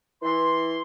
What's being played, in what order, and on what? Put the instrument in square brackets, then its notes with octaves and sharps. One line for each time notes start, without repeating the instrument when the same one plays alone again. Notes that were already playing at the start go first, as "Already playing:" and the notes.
[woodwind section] E3 C6